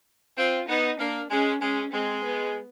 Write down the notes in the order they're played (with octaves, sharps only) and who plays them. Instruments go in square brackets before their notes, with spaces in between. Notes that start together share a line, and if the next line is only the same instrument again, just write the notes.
[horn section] C4 [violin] F4
[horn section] B3 [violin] D#4
[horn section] A#3 [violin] D4
[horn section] G#3 [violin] C#4
[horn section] G#3 [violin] C#4
[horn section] G#3 [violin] C4
[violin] B3